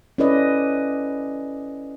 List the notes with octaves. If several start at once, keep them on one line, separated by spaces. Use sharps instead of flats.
C#4 E4 A4 B4 D5 D#5